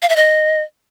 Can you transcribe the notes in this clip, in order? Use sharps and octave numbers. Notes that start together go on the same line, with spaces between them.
F5
E5
D#5